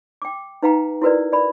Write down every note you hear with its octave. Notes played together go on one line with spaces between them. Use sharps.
G5 D6
D#4 B4 F5 G5 A#5
E4 F#4 A#4 B4 D5
D5 B5